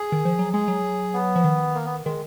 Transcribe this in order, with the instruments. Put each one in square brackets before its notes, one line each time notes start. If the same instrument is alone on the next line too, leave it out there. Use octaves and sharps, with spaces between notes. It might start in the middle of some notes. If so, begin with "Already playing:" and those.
Already playing: [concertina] G#4
[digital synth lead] D#3
F3
F#3
[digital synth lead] G#3 [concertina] G#4
[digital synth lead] F#3
[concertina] B3
[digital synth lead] F3
D#3
[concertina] A#3
B3
[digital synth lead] D#3 [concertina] G#3